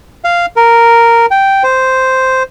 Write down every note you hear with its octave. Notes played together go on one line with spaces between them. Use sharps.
F5
A#4
G5
C5